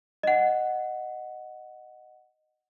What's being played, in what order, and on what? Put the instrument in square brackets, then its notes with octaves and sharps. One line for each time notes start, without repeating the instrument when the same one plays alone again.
[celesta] D#5 F#5